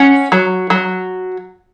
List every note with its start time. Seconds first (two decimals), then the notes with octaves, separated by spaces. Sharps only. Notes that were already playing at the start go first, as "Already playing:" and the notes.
Already playing: C#4 F#5
0.32 F#3
0.70 F#3